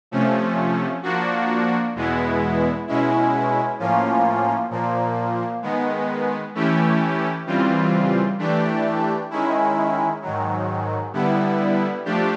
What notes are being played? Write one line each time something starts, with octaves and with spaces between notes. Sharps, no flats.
C3 F3 A3 C#4
F3 A#3 D4 F#4
E2 B2 G#3 B3 E4
B2 G#3 C#4 E4
A2 F3 A#3 C#4 F4
A#2 F3 A#3
D#3 G#3 B3
E3 A3 C#4 E4 G4
C#3 E3 G3 C4 F4
E3 A3 D4 G4
D#3 G#3 C#4 E4
G#2 D#3 F#3
D3 G3 B3 E4
F3 A3 D4 G4